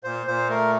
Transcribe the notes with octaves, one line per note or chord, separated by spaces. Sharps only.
A#2 C5
A#2 C5
A3 A#4